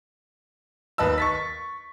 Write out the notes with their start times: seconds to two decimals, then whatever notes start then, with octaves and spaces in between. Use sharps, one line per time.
0.98 D#2 B4 D#5 A5 E6
1.18 C#6 A6 B6